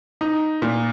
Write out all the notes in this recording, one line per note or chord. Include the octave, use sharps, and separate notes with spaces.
D#4
A#2